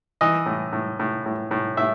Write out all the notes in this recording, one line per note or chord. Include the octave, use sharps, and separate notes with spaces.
E3 D#5
A2
A2
A2
A2
A2
A2 E5